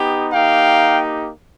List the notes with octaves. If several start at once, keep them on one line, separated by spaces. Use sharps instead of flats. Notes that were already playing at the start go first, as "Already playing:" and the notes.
Already playing: B3 D#4 G4
A#3 D#4 G4 F5 G5